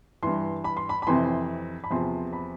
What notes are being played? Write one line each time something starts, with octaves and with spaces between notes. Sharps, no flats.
G2 E3 C6
B5
C6
B5
B5
F2 C3 E3 C6
B5
E2 C3 F3 C6
B5